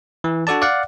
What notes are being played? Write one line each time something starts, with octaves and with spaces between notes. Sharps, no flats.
E3
D4 F#4 A4 D5 A5
D5 F5 F#5